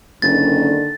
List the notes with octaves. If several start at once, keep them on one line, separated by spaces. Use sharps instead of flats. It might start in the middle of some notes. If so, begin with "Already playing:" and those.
F#1 D3 D#3 A6